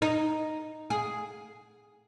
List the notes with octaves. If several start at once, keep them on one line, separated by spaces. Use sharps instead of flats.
D#4
G#4